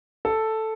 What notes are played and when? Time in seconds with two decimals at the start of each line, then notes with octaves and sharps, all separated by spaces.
0.25 A4